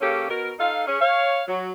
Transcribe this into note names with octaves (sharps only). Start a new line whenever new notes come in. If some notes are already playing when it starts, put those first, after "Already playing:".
C#3 A#3 C#4 G4 A4
B2 A#4
D#4 A4 F5
C#4 G#4
C#5 F5
F#3